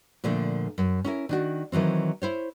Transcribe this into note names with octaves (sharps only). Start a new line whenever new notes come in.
A#2 D3 F3 A3
F#2
C#4 E4 A#4
D#3 D4 F#4
D#3 E3 F#3 C4
E4 C5 C#5